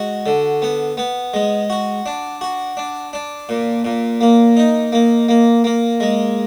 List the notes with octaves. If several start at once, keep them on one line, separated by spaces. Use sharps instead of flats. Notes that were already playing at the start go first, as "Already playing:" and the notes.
Already playing: G#3 F#4
D3
B3
B3
G#3
F#4
D4
F#4
D4
D4
A#2
A#2
A#3
D#4
A#3
A#3
A#3
G#3